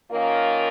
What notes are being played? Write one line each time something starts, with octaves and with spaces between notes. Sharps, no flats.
D#3 A#3 C#4 F4 A#4